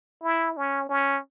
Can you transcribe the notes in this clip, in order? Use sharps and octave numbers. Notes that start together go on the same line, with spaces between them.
E4
C#4
C#4